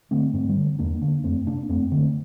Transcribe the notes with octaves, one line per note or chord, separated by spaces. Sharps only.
D3 A3 C4
G2 A3 C4
E3 G3
D3
E2 A#3 D4
D3 A#3 D4
F2 A3 C4
C3 A#3 D4
F2 A3 C4
D3 A3 C4